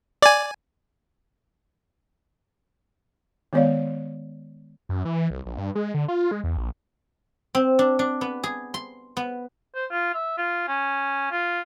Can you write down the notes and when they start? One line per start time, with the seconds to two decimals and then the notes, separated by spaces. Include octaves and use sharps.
0.22 D5 G#5
3.53 D#3 G#3 B3 C#5 D5 F5
4.89 F#2
5.05 E3
5.30 C2
5.46 A#1
5.58 G2
5.75 G#3
5.94 D3
6.08 F4
6.31 G#3
6.44 E2
6.57 A#1
7.55 C4
7.79 D4
7.99 D4
8.21 B3
8.44 G#4
8.74 C6
9.17 B3
9.76 C5
9.91 F4
10.15 E5
10.38 F4
10.68 C#4
11.31 F4